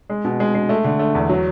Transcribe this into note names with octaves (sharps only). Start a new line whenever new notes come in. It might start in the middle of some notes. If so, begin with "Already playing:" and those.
G#3
B2
G#3
G#3
A3
D3
A3
E2
F#3